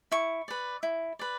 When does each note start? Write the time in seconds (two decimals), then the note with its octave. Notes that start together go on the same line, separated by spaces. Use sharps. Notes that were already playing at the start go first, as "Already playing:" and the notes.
0.12 E4 C#6
0.48 B4 D5
0.83 E4
1.19 B4 D5